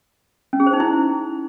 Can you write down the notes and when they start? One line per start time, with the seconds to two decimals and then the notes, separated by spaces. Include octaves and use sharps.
0.53 C#4
0.60 G#4
0.66 C5
0.73 D#4
0.80 E4